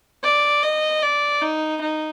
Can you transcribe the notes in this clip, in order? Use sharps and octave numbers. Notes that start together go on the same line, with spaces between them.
D5
D#5
D5
D#4
D#4